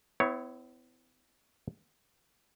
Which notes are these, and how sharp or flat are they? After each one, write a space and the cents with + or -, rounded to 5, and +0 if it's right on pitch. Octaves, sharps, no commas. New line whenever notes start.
B3 +45 E4 +0 C#5 +0